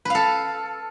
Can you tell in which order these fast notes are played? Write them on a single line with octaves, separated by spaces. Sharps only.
B4 F5 A4